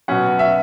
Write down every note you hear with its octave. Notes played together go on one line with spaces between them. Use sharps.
B2 F#3 C#4 F#5
E5